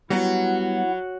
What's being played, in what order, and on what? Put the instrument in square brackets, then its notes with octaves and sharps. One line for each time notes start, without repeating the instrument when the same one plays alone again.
[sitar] F#3 [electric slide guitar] G3 B3 F#4 [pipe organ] E4 F#5